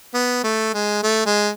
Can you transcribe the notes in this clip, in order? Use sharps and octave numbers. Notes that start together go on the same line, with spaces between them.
B3
A3
G#3
A3
G#3